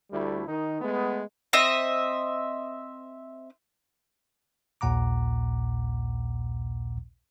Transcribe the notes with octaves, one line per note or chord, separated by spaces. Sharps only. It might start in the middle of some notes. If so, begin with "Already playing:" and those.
D2 G3 A3 E4
D#3 D#4
G#3 A3 B3
C4 D#5 E5
A#1 D#2 A#2 F#5 A#5 D6